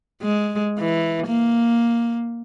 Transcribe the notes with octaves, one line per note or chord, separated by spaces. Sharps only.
G#3
E3
A#3